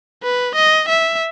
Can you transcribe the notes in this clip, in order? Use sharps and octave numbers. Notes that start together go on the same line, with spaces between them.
B4
D#5
E5